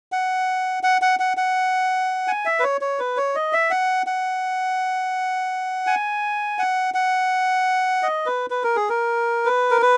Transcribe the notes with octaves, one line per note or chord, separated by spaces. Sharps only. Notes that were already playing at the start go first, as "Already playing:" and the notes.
F#5
F#5
F#5
F#5
F#5
G#5
E5
B4
C#5
C#5
B4
C#5
D#5
E5
F#5
F#5
G#5
F#5
F#5
D#5
B4
B4
A#4
G#4
A#4
B4
A#4
B4